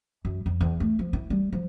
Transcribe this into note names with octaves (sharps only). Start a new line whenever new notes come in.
F#2
F2
E2
A3
F3
E4
G3
F3